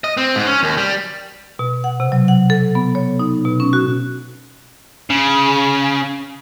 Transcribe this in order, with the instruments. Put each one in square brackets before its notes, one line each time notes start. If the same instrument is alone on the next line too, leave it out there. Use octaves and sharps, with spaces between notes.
[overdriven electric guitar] D#5
C4
G#2
C#4
D#2
G3
[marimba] B2
F#5
C3
F#3
F#5
A4
B3
C#5
D#4
B2
C#4
F#4
[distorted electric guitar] C#3